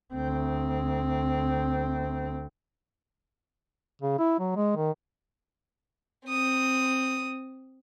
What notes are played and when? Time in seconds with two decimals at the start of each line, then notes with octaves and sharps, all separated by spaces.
0.13 D2 C4
4.02 C#3
4.19 E4
4.40 F#3
4.56 G#3
4.76 D#3
6.28 C4 D#6